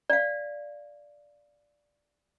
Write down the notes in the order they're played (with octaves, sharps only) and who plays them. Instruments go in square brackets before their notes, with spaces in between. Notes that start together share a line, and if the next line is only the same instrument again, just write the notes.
[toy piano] D5 F5